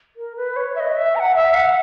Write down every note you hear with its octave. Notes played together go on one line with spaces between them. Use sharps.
A#4
B4
C#5
E5
D#5
E5
A#5
F#5
E5
F#5